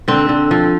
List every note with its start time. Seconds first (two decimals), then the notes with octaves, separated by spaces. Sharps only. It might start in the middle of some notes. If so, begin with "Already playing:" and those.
0.08 D3 C4
0.29 D3
0.51 F3